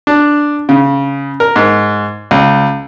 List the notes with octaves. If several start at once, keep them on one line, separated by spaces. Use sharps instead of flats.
D4
C#3
A#4
G#2
C#2